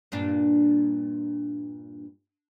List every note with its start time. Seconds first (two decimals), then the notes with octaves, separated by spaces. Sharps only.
0.12 G2 A#2 D4